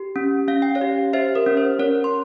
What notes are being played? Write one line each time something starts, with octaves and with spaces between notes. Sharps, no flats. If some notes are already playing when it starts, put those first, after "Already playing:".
Already playing: G4
C#4
C#4 F5
G5
C#5 F5
G4
G4 C5 E5
A#4
C#4
C5
C#4 A#4 C#5
C6